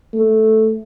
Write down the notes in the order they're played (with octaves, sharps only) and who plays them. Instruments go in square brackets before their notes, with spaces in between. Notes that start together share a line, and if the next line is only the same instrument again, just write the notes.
[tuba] A3